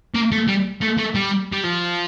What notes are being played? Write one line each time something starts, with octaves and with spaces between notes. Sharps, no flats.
A#3
A3
G3
A3
A3
G3
G3
F3